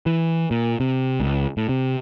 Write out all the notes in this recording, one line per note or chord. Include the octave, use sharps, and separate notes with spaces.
E3
A#2
C3
C#2
A2
C3